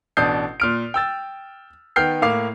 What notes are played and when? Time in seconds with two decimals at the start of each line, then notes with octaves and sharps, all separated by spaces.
0.17 A1 B2 D4 D#6 G6 C7
0.60 A#2 F6 D7
0.94 G5 E6 A6
1.96 D#3 B3 G5 F6 G6 C7
2.22 A2 A#3 F5 D6 C7